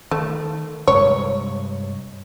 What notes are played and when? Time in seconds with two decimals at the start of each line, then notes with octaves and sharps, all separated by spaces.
0.11 D#3 A3
0.87 G2 C3 G#3 C#5